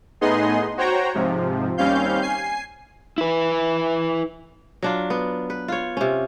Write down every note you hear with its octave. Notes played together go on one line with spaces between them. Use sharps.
A2 B3 D#4 G#4 D#5 C6
F#4 C5 C#5 G5 A#5
G#2 C3 F3
D#2 G3 C4 C#4 F5 G6
G#5 C7
E4 B4
F#3 D4 F4
B3
B4
F4 C#5
C3 C#4